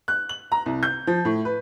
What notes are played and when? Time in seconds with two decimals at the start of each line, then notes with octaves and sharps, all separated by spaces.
0.08 F#6
0.29 F#7
0.52 A#5
0.66 C2
0.83 G6
1.07 F3
1.25 A2
1.45 B4